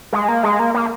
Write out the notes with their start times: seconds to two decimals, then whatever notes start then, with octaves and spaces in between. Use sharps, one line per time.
0.13 G#3
0.28 A#3
0.43 G#3
0.59 A#3
0.74 A#3